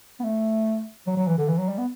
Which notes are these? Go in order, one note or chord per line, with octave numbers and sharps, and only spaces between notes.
B3
A3
F#3
F#3
E3
D3
E3
F#3
G3
B3